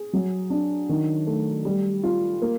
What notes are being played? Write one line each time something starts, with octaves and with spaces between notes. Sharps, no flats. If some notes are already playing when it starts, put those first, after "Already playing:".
Already playing: G#4
F#3
D4
D#3
A3
G3
F4
A#3